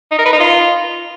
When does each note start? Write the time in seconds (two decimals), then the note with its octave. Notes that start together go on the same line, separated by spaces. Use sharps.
0.11 D#4
0.18 A#4
0.25 B4
0.33 D#4
0.40 F4